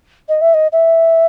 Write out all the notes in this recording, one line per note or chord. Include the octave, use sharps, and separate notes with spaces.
D#5
E5
D#5
E5